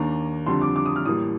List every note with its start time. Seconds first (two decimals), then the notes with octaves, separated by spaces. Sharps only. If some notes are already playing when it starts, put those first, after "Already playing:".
Already playing: D#2 D#3 A#3 D4 A#5
0.47 F2 D3 G3 D4 C6
0.62 D6
0.76 D6
0.86 D#6
0.96 F6
1.05 A1 A2 G3 A#3 D#6